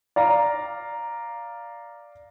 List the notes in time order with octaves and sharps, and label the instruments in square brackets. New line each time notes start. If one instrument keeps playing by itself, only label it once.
[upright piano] D5 F5 A#5